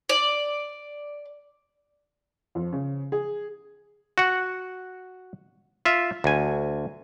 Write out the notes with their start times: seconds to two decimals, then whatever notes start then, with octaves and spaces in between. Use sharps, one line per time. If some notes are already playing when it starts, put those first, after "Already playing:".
0.09 D5
2.55 F2
2.73 C#3
3.12 G#4
4.18 F#4 F#5
5.85 F4 E5
6.24 D2 G#5